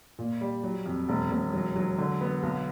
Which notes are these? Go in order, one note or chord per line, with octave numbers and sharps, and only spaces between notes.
A#2
G3
F#3
F2
E1
E1
F#3
F#3
D3
B3
B1